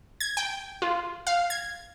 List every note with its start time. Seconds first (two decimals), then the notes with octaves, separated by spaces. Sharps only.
0.20 G#6
0.37 G5
0.82 F4
1.27 F5
1.50 G#6